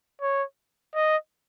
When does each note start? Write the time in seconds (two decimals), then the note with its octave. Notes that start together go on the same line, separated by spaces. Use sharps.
0.22 C#5
0.95 D#5